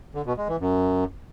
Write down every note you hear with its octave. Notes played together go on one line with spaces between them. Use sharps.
D3
B2
G#3
E3
F#2